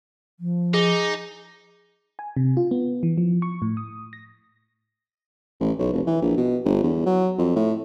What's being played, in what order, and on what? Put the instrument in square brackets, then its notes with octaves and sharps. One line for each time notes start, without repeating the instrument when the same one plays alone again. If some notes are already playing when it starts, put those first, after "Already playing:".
[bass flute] F3
[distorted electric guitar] D#4 [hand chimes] G#4
[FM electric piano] G#5
C3
F4
B3
E3
F3
C#6
A2
D#6
A#6
[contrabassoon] A1
B1
F1
E3
A#1
B2
G1
E2
F#3
F2
A2